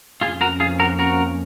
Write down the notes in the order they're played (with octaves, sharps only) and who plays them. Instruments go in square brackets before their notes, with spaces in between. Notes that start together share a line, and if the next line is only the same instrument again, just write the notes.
[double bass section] F2 F3 A#3 C#4 [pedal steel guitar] F4 G#4
[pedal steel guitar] F#4 A#4
F4 G#4
F#4 A#4
F#4 A#4